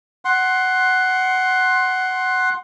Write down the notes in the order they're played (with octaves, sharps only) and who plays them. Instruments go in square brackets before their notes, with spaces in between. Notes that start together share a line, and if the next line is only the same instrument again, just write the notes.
[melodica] F#5 C6